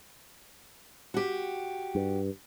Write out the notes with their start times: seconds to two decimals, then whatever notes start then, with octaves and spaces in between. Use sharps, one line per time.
1.14 F#4 G4
1.95 G2